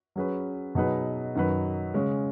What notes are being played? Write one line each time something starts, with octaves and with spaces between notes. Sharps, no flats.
F#3 C#4 G#4 B4
B2 F#3 D#4 G#4 B4
F#2 D#3 F#3 D#4 B4
C#3 G#3 C#4